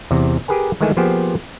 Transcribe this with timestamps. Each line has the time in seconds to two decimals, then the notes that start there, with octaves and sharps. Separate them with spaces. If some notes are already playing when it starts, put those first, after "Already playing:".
0.11 E2 C3
0.48 G4 G#4 A#4 B4 G#5
0.81 D#3 E3 G#3 A3 G#5 A5
0.97 F3 A#3 B3 G4 G#4 C5